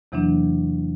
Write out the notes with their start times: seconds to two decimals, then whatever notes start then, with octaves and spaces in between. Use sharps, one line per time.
0.12 E2 C3 E3 F#3 A#3 D4